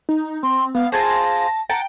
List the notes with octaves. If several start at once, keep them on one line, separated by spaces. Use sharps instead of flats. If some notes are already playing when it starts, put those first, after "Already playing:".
D#4
C4 C6
B3 F5
F4 G#4 C5 A5 A#6
F#5 G5 A5 A#5